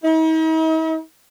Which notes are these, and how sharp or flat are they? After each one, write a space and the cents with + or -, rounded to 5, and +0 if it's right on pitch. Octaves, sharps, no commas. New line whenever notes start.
D#4 +45